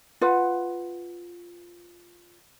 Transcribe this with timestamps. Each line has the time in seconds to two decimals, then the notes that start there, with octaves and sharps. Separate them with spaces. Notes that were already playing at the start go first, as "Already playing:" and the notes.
0.21 F4 B4 F#5